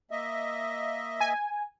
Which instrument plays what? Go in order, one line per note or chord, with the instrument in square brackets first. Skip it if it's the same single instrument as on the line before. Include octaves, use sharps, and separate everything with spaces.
[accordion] A#3 D#5 E5
[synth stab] G#5